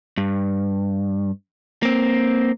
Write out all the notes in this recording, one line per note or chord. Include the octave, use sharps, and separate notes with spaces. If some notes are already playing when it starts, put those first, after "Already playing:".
G2
A#3 C4